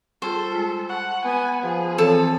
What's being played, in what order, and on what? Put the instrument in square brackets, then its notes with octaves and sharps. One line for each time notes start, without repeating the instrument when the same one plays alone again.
[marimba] G3 F4 G#4 [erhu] A4 [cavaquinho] C5
[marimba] G#3 F4
[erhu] F#5 [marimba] B5 C#6
[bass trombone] B3 [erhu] G#5
[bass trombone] F3 [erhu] G#4
[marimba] E3 C4 C#5 [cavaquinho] A4